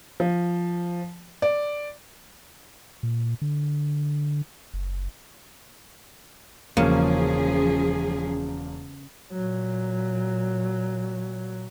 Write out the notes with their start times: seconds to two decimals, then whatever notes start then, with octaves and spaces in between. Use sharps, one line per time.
0.20 F3
1.42 D5
3.03 A#2
3.42 D3
4.74 F#1
6.77 E1 C#3 F3 A#3 C#4 G#4
9.32 A#2 F#3